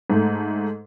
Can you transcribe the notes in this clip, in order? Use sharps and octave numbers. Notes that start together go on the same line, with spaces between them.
G#2 A3